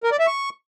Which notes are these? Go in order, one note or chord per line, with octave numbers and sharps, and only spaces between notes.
A#4
D5
E5
C#6